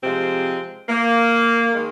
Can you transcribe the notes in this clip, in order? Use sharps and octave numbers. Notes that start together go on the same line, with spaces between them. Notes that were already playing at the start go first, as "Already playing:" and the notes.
C3 F3 G#3 C4
A#3
D#3 G#3